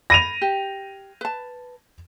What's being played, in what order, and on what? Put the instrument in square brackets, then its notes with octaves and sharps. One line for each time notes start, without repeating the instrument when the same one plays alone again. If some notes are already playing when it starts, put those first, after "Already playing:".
[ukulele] B5 [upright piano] A#6 D#7 F7
[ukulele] G4
B4 A5